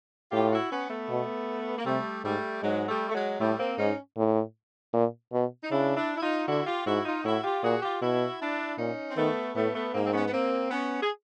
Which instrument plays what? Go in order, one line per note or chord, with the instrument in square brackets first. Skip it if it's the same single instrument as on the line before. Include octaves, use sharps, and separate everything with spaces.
[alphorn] A2 [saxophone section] F4 G4
[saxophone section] E4 F#4
B3 C#4
A3 B3
[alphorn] B2
[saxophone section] A#3
[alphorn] C3 [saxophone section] G3 A3
[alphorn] G#2 [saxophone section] G3 A3
[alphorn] G#2 [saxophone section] F#3 G#3
[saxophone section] G3 A3
A3
F#3 G#3
[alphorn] A2 [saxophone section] G3 A3
[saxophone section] A#3 C4
[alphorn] G#2 [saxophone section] C#4 D#4
[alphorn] A2
A#2
B2
[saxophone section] D#4
[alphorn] C#3 [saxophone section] D4 E4
[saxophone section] D4 E4
E4
D#4 F4
[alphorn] D3 [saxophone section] E4 F#4
[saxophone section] F4 G4
[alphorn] G#2 [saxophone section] E4 F#4
[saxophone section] D#4 F4
[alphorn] A2 [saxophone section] E4 F#4
[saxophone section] F4 G4
[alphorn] A#2 [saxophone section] F#4 G#4
[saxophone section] F4 G4
[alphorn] B2 [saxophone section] E4 F#4
[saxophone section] D4 E4
[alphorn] A#2 [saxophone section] C#4 D#4
[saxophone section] C4
[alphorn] D#3 [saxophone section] A3 B3
[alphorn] A2 [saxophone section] A3 B3
[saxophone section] A3 B3
[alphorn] G#2 [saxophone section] A#3 C4
[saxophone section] C4
B3 C#4
B3
A#3 C4
B3 C#4
G#4